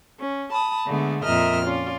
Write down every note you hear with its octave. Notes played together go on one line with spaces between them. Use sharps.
C#4
A5 B5 D#6
D3 G#3 A3 B3
F2 A#2 A#4 D#5 E5 F6
C#4 F4 D5